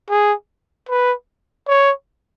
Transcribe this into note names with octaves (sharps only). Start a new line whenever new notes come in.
G#4
B4
C#5